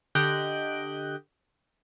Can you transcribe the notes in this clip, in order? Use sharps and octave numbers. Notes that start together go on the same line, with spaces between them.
D3 G4 D#5 F#6 G6 D7